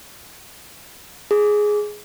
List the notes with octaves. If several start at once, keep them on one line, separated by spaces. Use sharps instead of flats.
G#4